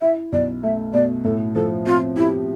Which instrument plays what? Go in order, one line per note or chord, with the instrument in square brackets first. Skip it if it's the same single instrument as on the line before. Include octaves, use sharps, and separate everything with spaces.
[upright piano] E4 [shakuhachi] E5
[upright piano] B1 [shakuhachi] D5
[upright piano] A3 [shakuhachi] E5
[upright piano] B2 [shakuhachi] D5
[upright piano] A2 [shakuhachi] A4
[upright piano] F3 [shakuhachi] A4
[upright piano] C4 [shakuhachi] F4
[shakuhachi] E4 [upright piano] G4